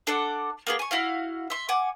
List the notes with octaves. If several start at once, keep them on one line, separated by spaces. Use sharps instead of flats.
D4 A4 D5 F#5
A#3 B3 G#4
G#5 C#6
E4 F#4 F5
E5 C6
F#5 G#5 D6